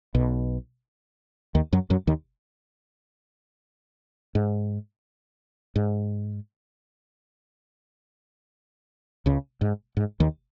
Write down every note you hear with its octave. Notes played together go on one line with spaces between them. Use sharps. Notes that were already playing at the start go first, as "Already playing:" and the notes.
B1 B2
D#2 D#3
F#2 F#3
F#2 F#3
D#2 D#3
G#2
G#2
C#2 C#3
G#2
G#2
D#2 D#3